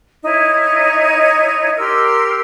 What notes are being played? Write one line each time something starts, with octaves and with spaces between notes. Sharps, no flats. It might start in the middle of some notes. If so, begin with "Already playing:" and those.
D#4 E4 C#5
G4 A#4 C6 E6